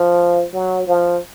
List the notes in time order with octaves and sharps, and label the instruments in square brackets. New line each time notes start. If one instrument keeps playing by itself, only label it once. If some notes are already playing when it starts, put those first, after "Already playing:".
Already playing: [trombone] F3
F#3
F3